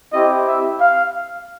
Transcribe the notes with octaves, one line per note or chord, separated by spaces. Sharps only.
C4 E4 G4 D#5
E5
F5